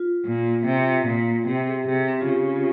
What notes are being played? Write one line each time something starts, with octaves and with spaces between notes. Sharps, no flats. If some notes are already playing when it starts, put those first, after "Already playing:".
Already playing: F4
A#2
C3
A#2
C3 G4
G#4
C3 G4
C4
F4
C#3 G4
F4